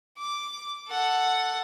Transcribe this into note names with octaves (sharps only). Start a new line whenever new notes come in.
D6
A4 F#5